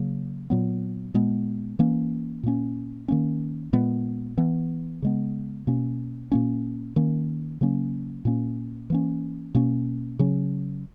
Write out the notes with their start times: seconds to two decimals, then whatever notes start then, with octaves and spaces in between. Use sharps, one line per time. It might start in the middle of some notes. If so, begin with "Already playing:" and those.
Already playing: C#3 F#3 A#3
0.50 A#2 F#3 B3
1.14 A#2 G#3 B3
1.79 E3 A#3 C#4
2.43 A#2 A#3 C#4
3.08 D#3 A#3 C#4
3.73 A#2 G#3 B3
4.37 E3 B3
5.02 C#3 G#3 B3
5.67 B2 A#3 C#4
6.32 A#2 A#3 C#4
6.96 D#3 A#3 C#4
7.61 C#3 F#3 A#3 C#4
8.25 A#2 A#3 C#4
8.90 E3 A#3 C#4
9.55 B2 A#3 C#4
10.19 C#3 F#3 C#4